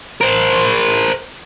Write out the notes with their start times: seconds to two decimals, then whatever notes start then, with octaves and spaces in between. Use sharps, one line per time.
0.21 A#4 C5